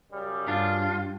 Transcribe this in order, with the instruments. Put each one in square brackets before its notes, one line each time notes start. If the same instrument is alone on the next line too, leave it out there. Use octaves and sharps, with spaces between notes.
[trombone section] F#2 C#3 G3
[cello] G2 [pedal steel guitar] D4 [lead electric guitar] F4